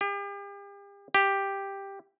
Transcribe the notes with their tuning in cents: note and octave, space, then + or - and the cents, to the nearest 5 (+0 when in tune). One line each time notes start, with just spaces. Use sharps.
G4 +40
G4 +5